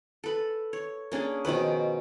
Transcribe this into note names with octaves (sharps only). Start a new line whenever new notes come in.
A4 B4
C#5
A#3 C#4 D4 G#4
B2 D#3 F3 B4